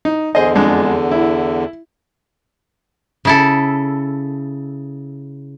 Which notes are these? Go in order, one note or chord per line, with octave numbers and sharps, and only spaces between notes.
D#4
E2 D3 G#4 C5 D#5
F2 G#3 D4
E4
C#3 E4 A4